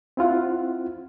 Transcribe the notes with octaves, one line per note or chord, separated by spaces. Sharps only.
C4 E4 F4 F#5